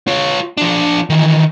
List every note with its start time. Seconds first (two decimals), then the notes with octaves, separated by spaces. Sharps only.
0.07 F4 C#5
0.57 F3 D4
1.10 D#3 E3